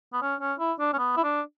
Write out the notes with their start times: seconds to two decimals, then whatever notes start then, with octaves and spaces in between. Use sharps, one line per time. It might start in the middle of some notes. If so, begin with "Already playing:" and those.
0.13 B3
0.22 C#4
0.40 C#4
0.59 E4
0.79 D4
0.93 C#4
0.98 B3
1.17 E4
1.24 D4